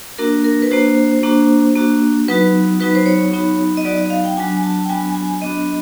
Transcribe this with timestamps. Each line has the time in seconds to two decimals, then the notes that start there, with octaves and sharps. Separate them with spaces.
0.18 A#3 D4 F#4 A#4
0.44 A#4
0.62 B4
0.71 A#3 D4 F#4 C5
1.23 A#3 D4 F#4
1.75 A#3 D4 F#4
2.28 F#3 B3 D#4 F#4 B4
2.80 F#3 B3 D#4 F#4 B4
2.95 C5
3.06 C#5
3.33 F#3 B3 D#4 F#4
3.77 D#5
3.85 F#3 B3 D#4 F#4 D5
3.98 D#5
4.10 F5
4.24 G5
4.37 F#3 B3 D4 F#4 G#5
4.63 A5
4.84 G5
4.89 F#3 B3 D4 F#4 G#5
5.15 G#5
5.41 F#3 B3 D4 F#4 D#5